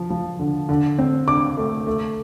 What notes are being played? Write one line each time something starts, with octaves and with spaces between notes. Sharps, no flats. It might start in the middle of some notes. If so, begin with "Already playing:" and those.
Already playing: F3
F3
D3
D3
C4
D3 D6
A3
A3